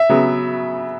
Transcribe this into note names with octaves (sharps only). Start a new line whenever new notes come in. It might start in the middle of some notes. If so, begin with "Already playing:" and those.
Already playing: E5
C#3 F#3 B3